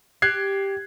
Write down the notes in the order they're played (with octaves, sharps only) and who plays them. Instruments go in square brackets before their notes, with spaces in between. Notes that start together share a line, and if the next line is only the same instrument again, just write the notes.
[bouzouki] G4 [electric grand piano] F#6 G#6 C7